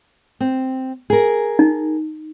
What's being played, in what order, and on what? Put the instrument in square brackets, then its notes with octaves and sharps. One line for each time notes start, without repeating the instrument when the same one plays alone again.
[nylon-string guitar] C4
G#4 A#4
[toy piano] D#4